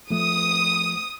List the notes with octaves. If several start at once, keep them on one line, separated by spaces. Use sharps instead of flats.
F3 A3 D#6